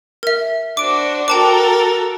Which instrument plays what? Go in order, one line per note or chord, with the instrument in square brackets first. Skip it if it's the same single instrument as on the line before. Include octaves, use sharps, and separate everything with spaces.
[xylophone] A#4 E5
[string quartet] D4 F#4 C5 [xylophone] D6 D7
[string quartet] F#4 A4 A#4 [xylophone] G5 A5 D6